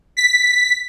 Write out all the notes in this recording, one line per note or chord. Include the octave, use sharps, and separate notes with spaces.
B6